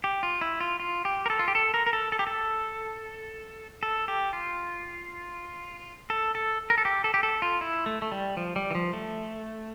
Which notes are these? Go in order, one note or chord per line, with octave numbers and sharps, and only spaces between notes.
G4
F4
E4
F4
F4
G4
A#4
A4
F4
G4
A4
A#4
A#4
A4
A4
G4
A4
A4
G4
F4
A4
A4
A#4
A4
G4
A4
G4
A4
F4
E4
A3
A3
G3
F3
G3
E3
F3
A3